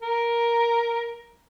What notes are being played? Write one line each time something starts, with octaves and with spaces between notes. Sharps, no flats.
A#4